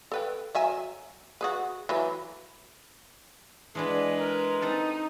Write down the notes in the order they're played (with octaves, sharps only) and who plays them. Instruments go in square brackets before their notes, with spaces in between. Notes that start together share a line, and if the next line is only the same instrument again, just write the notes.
[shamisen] A4 B4 G5
F#3 E5 G#5
F#4 G#4 B4
E3 F#3 B4
[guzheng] E3 D4 F#4 [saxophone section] G#3 [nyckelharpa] B4
[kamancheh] A#4
[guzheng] C4 A4 A5 [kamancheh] D#4